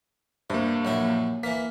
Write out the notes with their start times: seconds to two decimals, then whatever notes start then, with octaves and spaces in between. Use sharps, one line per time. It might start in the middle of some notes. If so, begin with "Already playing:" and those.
0.50 G2 C3 A#3
0.85 A#1 F#3 E4
1.43 E3 A#3 B6